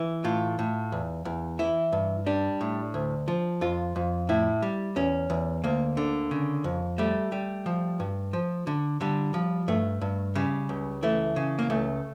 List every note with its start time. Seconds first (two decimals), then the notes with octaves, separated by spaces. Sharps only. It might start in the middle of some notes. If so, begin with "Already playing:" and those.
Already playing: E3
0.24 A2 F4
0.59 A2
0.92 E2
1.25 E2
1.59 E3 E4
1.92 G2
2.26 G3 D4
2.61 A2
2.94 D2
3.28 F3
3.61 F2 F4
3.96 F2
4.29 A2 E4
4.62 G3
4.96 E2 C#4
5.30 E2
5.64 D2 A#3
5.97 D3
6.31 C#3
6.64 F2
6.98 G3 A3
7.32 G3
7.66 F3
8.00 G2
8.33 F3
8.67 D3
9.01 D3 G3
9.34 F3
9.68 G2 A3
10.01 G2
10.35 C#3 G3
10.69 C#2
11.03 E3 A3
11.36 C#3
11.59 A#3
11.70 C#2 A3